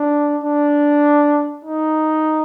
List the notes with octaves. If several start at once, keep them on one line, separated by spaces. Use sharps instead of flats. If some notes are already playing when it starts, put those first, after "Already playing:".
Already playing: D4
D4
D#4